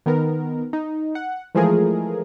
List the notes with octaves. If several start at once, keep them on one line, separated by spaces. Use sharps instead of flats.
D#3 B3 A#4
D#4
F#5
E3 F3 G#3 A3 G#4 A#4